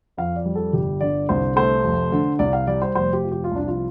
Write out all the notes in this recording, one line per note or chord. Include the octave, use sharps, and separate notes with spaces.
F2 F5
D5
G3
A4
G1 G4
D3 D5
C2 C5
A3 C5
F1
D3
C2 D5
F5
G3 D5
C5
F1 C5
G4
F3
G4
F4
C2 D4
F4